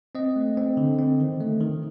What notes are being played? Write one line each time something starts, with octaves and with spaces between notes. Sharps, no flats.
C4 D#5
A3
C4
D3
C4
D#3
A3
D#3